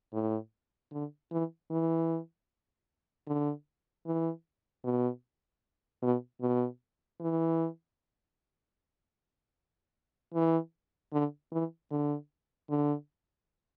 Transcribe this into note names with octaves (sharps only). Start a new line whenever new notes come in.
A2
D3
E3
E3
D3
E3
B2
B2
B2
E3
E3
D3
E3
D3
D3